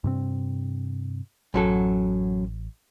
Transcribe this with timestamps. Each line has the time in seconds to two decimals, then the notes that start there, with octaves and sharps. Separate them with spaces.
0.04 G2 C3 C4
1.54 A1 F#2 F#3 A4